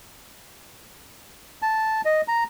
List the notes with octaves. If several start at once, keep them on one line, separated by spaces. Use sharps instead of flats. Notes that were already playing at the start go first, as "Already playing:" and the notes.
A5
D#5
A#5